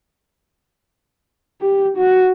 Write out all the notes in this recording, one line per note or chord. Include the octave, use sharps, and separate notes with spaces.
G4
F#4